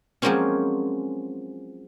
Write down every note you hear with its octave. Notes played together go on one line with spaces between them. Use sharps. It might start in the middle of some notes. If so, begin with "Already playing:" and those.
F3 F#3 G#3 A#3 C4 C#4